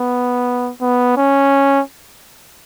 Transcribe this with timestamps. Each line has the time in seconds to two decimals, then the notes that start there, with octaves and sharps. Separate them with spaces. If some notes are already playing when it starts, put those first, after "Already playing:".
Already playing: B3
0.81 B3
1.17 C#4